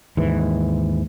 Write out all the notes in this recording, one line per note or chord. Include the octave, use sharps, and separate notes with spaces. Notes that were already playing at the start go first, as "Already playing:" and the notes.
D#2 G#2 E3